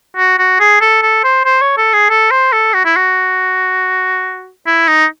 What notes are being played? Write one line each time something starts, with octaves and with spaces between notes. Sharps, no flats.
F#4
F#4
G#4
A4
A4
C5
C5
C#5
A4
G#4
A4
C5
A4
F#4
E4
F#4
E4
D#4